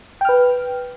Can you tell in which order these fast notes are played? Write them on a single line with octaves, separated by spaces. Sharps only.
G5 F6 B4